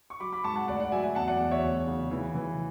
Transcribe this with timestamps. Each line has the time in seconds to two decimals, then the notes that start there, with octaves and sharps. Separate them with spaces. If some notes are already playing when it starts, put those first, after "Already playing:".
0.10 C#6
0.20 F#3 B5 D6
0.33 B5 D6
0.44 G#2 A5 C#6
0.56 F#5 A5
0.68 D2 D5 F#5
0.80 D5 F#5
0.92 F#3 E5 G#5
1.03 E5 G#5
1.15 E2 F#5 A5
1.28 D5 F#5
1.39 E2
1.51 C#5 E5
1.63 D2
1.87 C#3
2.11 E3
2.35 E3